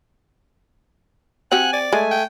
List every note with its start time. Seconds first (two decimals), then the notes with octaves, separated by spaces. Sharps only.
1.52 C4 F#4 G4 F#5 G#5
1.73 D5
1.93 G#3 A3 G#5
2.11 G5